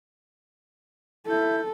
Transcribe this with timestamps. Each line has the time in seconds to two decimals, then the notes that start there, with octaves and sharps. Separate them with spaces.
1.26 E4 A4 G6